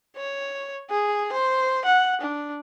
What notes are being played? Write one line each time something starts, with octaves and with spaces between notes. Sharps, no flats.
C#5
G#4
C5
F#5
D4